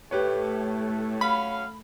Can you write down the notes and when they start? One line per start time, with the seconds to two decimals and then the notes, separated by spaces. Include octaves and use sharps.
0.11 A2 A3 G4 B4 C#5
1.21 F#3 C#4 F5 B5